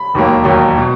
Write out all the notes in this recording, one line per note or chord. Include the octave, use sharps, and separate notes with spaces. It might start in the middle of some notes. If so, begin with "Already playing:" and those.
Already playing: B5
E1 D#2 D#3 F#3 A#3
E1 D#2 D#3 F#3 A#3
B2